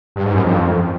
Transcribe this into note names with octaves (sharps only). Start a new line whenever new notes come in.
G2
G#2
F#2
F2